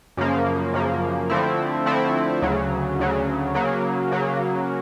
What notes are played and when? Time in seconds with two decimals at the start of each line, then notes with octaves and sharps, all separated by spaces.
0.17 F#2 C#3 F3 A#3
0.74 F#2 C#3 F3 A#3
1.30 D3 F3 A3 C4 E4
1.86 D3 F3 A3 C4 E4
2.42 D2 C#3 F#3
2.99 D2 C#3 F#3
3.55 C#3 F#3 A#3
4.12 C#3 F#3 A#3